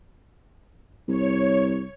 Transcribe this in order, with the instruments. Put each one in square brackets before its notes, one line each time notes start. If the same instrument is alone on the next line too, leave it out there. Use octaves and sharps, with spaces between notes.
[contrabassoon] C2 [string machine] C#5